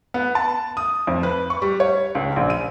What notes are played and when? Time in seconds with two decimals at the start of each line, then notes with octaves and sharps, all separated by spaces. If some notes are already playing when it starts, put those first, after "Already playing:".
0.14 B3
0.35 A5
0.77 D#6
1.07 F2
1.23 B4
1.50 C#6
1.62 G3
1.80 C#5
2.15 C#2
2.36 A#1
2.50 D#7